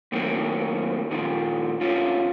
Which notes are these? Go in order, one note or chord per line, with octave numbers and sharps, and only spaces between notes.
A2 D#3 F#3 A3 A#3 C4
A#2 D#3 F3
D3 F3 C#4 F4